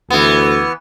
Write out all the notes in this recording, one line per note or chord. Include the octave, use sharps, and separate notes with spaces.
D2 E3 B3